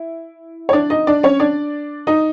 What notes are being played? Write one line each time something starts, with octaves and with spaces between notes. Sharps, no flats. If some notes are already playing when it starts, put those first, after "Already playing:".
Already playing: E4
C#5
D4 D5
D#4 D#5
D4 D5
C#4 C#5
D4 D5
D#4 D#5